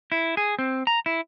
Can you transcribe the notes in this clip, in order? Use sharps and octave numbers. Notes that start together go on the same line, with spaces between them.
E4
G#4
C4
A#5
E4